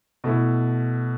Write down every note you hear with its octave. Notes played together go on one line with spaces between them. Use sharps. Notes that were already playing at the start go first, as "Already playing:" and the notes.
B2 A3 E4